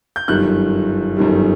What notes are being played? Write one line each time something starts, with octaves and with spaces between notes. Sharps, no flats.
G6
G1 F#2 D#3 G3 F#6
G1 F#2 D#3 G3